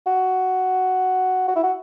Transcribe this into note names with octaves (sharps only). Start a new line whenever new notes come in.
F#4
F#4
E4
F#4